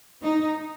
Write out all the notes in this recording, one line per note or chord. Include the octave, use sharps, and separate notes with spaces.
D#4